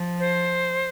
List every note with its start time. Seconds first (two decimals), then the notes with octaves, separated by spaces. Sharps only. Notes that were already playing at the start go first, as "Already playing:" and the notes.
Already playing: F3
0.19 C5